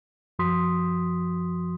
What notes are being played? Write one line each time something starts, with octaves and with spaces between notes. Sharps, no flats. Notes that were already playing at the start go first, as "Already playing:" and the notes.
F#2 F3 F#4 C6 D#6 B6